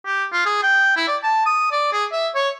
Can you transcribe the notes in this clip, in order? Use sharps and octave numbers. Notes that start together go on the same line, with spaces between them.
G4
F4
G#4
G5
E4
D5
A5
D#6
D5
G#4
E5
C#5